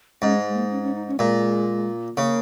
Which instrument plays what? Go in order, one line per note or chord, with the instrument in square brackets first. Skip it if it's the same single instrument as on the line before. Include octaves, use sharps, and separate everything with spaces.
[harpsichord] G#2 [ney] C#4
[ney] G#3
A#3
C#4
C#4
D#4
C#4
[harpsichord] A#2 [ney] G#3
[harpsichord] C#3 [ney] A#3